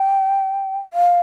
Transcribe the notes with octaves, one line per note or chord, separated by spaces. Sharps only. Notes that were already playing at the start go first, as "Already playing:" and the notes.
Already playing: G5
F5